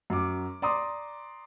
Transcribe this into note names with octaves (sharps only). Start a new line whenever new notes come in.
F#2 F#4 D6
D5 A#5 C6 D6 D#6